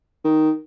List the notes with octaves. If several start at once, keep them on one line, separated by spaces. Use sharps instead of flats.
D#3